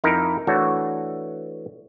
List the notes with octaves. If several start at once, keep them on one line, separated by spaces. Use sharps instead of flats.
F2 D#4 E4 A#4
E3 A3 D4 F#4 C#5